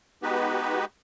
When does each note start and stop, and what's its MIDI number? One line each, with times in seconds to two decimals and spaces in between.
0.23 0.85 56
0.23 0.85 59
0.23 0.85 63
0.23 0.85 66
0.23 0.85 67
0.23 0.85 71